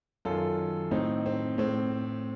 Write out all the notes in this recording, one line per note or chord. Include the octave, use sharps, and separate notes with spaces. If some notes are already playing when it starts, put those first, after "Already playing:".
F#2 D#3 F4 A4
A2 C4 D#4
C4
A2 C4